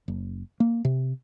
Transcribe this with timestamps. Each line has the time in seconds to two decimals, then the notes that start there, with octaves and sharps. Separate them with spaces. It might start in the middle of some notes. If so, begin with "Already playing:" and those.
0.08 F#1
0.60 A#3
0.85 C3